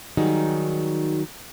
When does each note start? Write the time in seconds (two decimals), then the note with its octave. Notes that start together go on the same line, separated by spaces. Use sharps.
0.17 D#3 F#3 G3 D#4 F#4 G#4